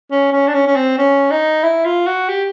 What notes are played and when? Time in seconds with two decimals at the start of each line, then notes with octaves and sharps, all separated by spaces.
0.11 C#4
0.32 C#4
0.47 D4
0.54 C#4
0.66 C#4
0.75 C4
0.98 C#4
1.31 D#4
1.63 E4
1.85 F4
2.06 F#4
2.29 G4